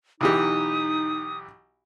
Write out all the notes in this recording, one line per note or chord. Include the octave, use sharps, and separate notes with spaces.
B1 E3 D#4 G4 D#6